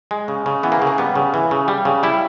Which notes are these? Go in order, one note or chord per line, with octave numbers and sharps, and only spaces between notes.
G#3
C#3
C#3
E3 B3
A#3
C#3
A#3
G3 B3
C#3
E3
C#3
G3
C#3
G3 E4